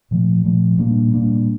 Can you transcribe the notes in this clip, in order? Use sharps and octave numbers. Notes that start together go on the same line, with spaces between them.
A#2 F3 A3
A#2 F3 A3
A#2 G3 A#3 D4
A#2 G3 A#3 D4